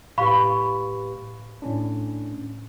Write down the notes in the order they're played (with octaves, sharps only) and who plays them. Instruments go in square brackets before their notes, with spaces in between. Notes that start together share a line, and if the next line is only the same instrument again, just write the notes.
[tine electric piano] A2 G4 B4 [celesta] F5 B5 C#6
[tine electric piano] A2 C#4 D4